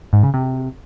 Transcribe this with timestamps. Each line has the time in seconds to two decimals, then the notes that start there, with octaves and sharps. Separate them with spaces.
0.13 G#2
0.23 C#3
0.34 C3